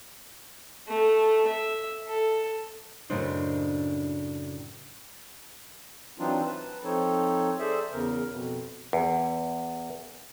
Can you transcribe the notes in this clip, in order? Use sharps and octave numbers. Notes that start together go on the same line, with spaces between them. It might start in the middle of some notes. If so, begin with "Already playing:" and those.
A3
E5
A4
F#2 A2 C#3 D4 C5 D#5
E3 F#3 C4 D4 D#4 F4
B4 A5
F3 C4 D#4 A4 C#5
G#4 A4 C5 D5 E5
E2 C#3 A#4
F2 B2
E2